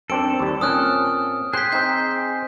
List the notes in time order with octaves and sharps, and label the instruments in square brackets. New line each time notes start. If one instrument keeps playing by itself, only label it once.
[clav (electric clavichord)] F#2 C4 D4 [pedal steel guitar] A4 [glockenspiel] D7
[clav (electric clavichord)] D#2 G3
[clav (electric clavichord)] A#2 C4 C#4 [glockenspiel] D#6 F6 F#6
[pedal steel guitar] G#4 C5 G5 [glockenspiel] F#6 B6
[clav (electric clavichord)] C4 D#4 [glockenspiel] G6